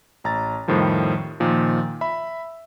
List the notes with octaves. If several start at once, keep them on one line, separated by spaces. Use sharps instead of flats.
A1 A#5 A6
F2 A2 D#3 F3 G3
A#2 D#3 F3
E5 B5